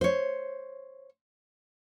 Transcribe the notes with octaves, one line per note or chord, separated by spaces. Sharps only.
C5 C#5